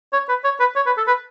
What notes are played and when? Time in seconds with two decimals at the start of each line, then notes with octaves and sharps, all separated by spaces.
0.13 C#5
0.29 B4
0.44 C#5
0.60 B4
0.76 C#5
0.86 B4
0.97 A4
1.07 B4